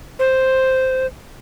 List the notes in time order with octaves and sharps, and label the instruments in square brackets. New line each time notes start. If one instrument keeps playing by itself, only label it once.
[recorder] C5